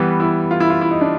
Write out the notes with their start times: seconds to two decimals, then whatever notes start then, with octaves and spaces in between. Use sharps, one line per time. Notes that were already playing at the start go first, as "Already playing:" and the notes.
Already playing: E3 G3 B3
0.20 E4
0.51 F4
0.60 E4
0.70 F4
0.81 E4
0.91 D#4
1.01 D4